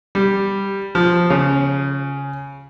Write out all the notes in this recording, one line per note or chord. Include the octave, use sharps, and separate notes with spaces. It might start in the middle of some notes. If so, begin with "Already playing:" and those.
G3
F3
C#3